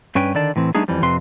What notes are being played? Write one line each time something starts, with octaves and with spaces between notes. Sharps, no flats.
G2 C#4 B4 G5
D3 D#3 D5 A5
A2 E3 C4
G3 A3 B3 D4 D#4 G#4
F2 E3 F3 G3
F2 C3 C4 B4 C6